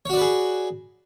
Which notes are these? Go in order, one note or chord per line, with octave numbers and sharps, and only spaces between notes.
F#4 G#4 B4 C#5 D5